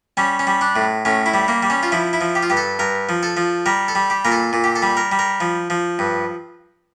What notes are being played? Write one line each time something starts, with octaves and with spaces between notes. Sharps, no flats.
G3 C#4
C#4
G3
D4
A2
A2 C#4
E4
G3
A#3
G3
C#4
F4
F3 E4
E4
F3
G4
F4
G2 G4
A4
G2 A#4
F3
A4
F3
G3 A#4
A4
G3
G4
A#2 A#4
A4
A#2
G4
A4
G3
A#4
G3
A#4
F3
F3
G2